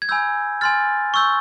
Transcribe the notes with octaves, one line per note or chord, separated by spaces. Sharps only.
G#6
G#5 B5 E6 G6
G#5 C6 F6 A6
C#6 E6 G6